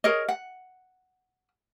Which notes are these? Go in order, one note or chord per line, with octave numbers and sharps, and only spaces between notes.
G#4 A#4 C#5 D#5
F#5